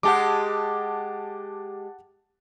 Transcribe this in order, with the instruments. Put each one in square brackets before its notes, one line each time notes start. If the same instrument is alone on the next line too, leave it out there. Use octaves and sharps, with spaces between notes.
[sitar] G#3 G4 [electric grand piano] F#5 A5 D6